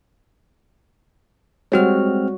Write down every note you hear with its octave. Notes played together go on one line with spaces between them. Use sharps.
G3 G#3 C4 F#4 C#5 F6